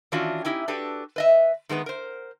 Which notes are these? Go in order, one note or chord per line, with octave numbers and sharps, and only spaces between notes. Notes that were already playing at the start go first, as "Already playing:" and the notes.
D#3 E3 C#4 D4 F4 F#4
C#4 D#4 E4 G4
D4 F#4 G4 A4 B4
B4 D#5 E5
D#3 G#3 A#3 B3
A#4 C5